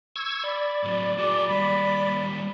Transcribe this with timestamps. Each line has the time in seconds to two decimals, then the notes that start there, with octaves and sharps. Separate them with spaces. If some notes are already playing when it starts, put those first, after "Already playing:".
0.16 C#6 E6 G#6
0.44 D5 B5
0.83 A2 F#3
1.18 F#4 G#4 D6
1.48 D#2 G3 B5